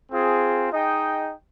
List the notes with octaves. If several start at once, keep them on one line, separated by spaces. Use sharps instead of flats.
C4 F4 G#4
D#4 G#4 D#5 G5